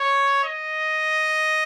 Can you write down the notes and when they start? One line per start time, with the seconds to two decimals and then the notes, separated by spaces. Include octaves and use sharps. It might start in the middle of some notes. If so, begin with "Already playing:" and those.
Already playing: C#5
0.44 D#5